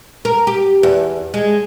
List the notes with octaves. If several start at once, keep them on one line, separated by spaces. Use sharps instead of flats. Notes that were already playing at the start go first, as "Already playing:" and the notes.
A#4
G4
E2
G#3